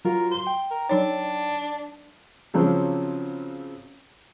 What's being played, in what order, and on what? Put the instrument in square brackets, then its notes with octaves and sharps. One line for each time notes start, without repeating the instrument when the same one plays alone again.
[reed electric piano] F#3 F4 F#4 [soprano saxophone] A#4
[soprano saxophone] C6
[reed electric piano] G5
[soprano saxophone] A#4
[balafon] F#3 D#4 C#5 [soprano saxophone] D4
[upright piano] C#3 F3 F#3 C4 C#4